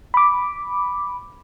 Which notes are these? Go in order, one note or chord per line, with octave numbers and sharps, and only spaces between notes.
B5 D6